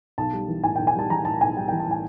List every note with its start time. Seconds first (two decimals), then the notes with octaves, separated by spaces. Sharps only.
0.18 B1 A5
0.33 G3
0.49 E3
0.64 A2 G#5
0.76 B1 G5
0.87 G#5
0.95 G3 A5
1.10 E3 A#5
1.25 A2 A5
1.41 B1 G#5
1.56 G3 G5
1.68 E3 G5
1.79 A5
1.87 A2 G#5